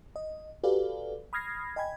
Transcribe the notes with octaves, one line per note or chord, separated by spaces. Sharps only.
D#5
F#4 G4 A4 B4 D5 F5
B5 D#6 F6 G#6 A#6 C7
D#5 G5 G#5 B5 G#6